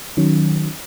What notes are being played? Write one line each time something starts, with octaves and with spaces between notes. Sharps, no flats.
D#3 F#3 C#4